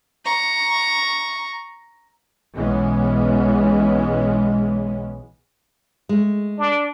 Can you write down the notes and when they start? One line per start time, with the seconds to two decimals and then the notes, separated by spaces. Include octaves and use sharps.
0.25 A#5 C#6
2.56 B1 E3 G#3 B3 C#4
6.09 G#3 A3
6.59 D4